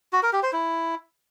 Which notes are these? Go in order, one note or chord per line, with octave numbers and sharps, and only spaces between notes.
F#4
A#4
G4
C5
E4